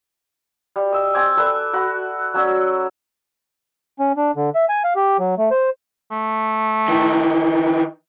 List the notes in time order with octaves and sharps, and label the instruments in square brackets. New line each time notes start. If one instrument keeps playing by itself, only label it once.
[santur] G3
D#5 E6
C4 G#5 D6
A4 B4 D5 E5
F#4 B5
F#3 C#4 D5 E6
[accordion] C#4
D4
D3
E5
G#5
F5
G4
F#3
A3
C5
[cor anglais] A3
[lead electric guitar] D#3 E3